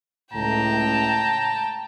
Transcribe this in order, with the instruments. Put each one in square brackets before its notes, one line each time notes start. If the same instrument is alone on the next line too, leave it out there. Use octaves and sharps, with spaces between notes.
[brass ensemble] C#2 A2 [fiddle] G5 A5 [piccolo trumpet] A#5